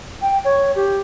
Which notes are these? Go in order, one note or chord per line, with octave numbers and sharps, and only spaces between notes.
G5
C#5
G4